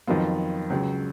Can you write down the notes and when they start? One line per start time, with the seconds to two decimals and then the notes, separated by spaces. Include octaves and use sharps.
0.07 F2 D#3 F#3 B3 F4
0.70 C#2 C#3 F#3